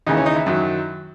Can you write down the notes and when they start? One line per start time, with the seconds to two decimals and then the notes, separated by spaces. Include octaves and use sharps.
0.06 D#2 C#3 E3 D#4
0.17 C#4
0.26 D#4
0.36 E4
0.46 F#2 D#3 F#3